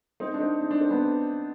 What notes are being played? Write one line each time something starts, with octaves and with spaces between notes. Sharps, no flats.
C4 D#4
D4
C4 D#4
D#4
D4
C4
B3 D4